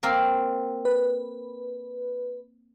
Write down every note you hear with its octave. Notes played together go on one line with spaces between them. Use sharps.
A#3 C4 A#4
B4